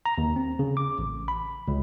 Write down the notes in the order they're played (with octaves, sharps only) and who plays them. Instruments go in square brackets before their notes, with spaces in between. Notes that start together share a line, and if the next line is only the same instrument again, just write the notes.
[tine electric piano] A#5
D#2
C4
C#3
D6
A1
B5
C#2